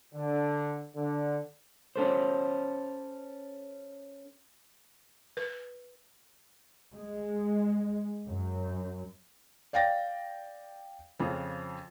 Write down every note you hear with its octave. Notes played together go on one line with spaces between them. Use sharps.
D3
D3
C#4 A4 C5
B4
G#3
F#2
D5 F5 G5 A6 A#6
F2 C#3 F3